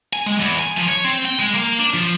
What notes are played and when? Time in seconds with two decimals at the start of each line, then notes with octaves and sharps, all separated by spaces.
0.13 G#5
0.26 G#3
0.40 E2
0.59 G#5
0.76 F3
0.88 C#5
1.05 C4
1.25 G5
1.39 G#3
1.54 A#3
1.79 D4
1.94 F3